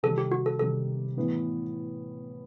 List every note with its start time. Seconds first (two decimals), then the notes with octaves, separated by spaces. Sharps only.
0.03 C3 D#3 G3 A4
0.18 G4
0.32 F#4
0.46 A4
0.59 C3 D#3 G3 A4
1.17 A2 E3 B3